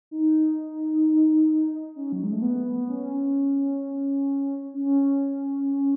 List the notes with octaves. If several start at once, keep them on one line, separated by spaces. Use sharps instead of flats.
D#4
C#4
F#3
G#3
A3
B3
C#4
C#4